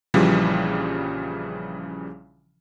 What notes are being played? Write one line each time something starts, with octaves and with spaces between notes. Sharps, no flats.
A#1 C#3 E3 F3 G3